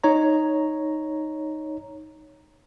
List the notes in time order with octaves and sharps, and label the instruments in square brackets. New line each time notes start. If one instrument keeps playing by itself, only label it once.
[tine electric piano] D#4 C#5 A#5